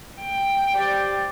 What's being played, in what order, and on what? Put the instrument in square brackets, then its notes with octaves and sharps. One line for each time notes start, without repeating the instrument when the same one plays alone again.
[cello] G5
[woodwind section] G4 C5 D5